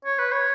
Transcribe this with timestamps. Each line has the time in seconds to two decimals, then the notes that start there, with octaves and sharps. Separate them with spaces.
0.05 C#5
0.19 B4
0.32 C#5